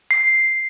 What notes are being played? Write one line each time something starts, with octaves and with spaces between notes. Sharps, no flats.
C7